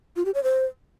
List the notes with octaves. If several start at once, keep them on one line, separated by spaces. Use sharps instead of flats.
F4
G4
C#5
C5